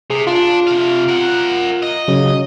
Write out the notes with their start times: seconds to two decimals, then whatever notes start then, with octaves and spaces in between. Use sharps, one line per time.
0.10 C3 G#4
0.27 D4 F4
0.67 C3 F5
1.08 A#4 F#5
1.82 D#5
2.08 C#3 F#3